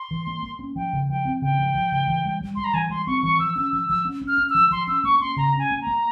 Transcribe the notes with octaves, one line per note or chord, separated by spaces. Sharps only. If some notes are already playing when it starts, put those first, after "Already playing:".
Already playing: C6
E3
A#3
A#3
C#4
F3 G5
C#3
F3 G5
C4
C#3 G5
F3
F3
C#3
E3
G3
G3
G3 C6
A#5
E3 G#5
G3 C6
C4 C#6
E3 C#6
F3 E6
C#4 E6
F3 E6
F3 E6
C#4
C#4
F6
C#4
E6
F3
F3 C6
C#4 E6
A#3 C#6
C#4 C6
C#3 A#5
C#4
G#5
A#3
A#5
A#3